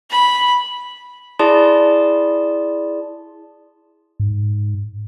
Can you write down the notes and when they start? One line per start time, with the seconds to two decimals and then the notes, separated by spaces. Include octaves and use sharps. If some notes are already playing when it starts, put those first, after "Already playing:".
0.10 B5
1.39 E4 G#4 D5 A5 C6
4.20 G#2